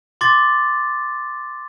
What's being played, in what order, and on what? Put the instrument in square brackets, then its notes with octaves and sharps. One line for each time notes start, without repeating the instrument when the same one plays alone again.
[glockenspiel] C6 D6 A6